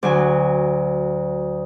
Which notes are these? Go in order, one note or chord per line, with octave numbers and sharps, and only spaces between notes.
D2 F#3 G#5